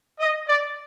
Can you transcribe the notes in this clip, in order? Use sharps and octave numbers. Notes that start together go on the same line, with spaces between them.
D#5
D5